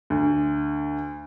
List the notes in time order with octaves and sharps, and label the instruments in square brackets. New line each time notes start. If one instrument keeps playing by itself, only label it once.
[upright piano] D2